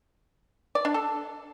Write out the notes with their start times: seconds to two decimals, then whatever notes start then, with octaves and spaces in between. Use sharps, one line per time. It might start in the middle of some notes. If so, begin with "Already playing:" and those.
0.75 D5
0.85 D4
0.94 A4